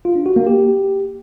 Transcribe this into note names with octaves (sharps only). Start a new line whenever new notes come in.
F4
D4
F#4
A#3
G4